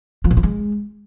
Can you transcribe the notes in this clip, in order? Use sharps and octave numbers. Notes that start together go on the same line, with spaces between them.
F3
A#2
F3
G#3